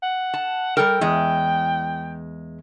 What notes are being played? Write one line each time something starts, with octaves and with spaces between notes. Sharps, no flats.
F#5
A5
G3 A4 A#4 G5
E2 G#3